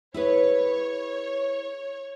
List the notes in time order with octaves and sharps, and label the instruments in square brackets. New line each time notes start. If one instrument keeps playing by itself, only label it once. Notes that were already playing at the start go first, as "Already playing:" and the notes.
[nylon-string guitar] E4 G#4 B4 [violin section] C#5